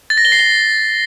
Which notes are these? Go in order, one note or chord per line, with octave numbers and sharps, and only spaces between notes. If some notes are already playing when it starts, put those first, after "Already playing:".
A6
A#6
G7
C7
G7